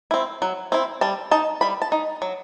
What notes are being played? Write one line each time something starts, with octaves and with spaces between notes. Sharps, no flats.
C4 E4
F#3
C4 E4
G3 A5
D#4 A5
G3 B5
A5
D#4
F#3